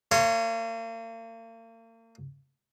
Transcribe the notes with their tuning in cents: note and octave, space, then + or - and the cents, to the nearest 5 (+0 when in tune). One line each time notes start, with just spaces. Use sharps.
A#3 -40 C#5 +0 C6 +0